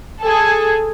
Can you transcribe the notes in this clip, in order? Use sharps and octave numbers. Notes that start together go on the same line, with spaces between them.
G#4 A4